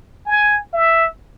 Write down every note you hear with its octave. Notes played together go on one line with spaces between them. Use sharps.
G#5
E5